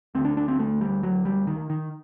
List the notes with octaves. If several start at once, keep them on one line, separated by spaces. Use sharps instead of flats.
D2 D3 C4
D4
D4
C4
A3
G3
F#3
G3
D#3
D#3